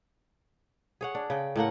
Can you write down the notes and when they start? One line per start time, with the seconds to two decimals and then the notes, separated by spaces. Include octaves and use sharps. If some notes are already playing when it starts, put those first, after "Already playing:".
1.01 G#4 C#5 F#5
1.15 D4
1.30 C#3 G5
1.56 A2 A3 A#3 F#5